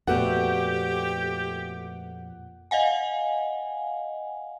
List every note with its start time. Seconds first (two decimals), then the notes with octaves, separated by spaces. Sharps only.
0.07 F2 A#2 A3 B3 F#4 G4 F#5
2.71 D#5 F5 F#5 G#5